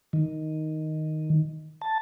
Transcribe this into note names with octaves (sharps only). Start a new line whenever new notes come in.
D#3
A5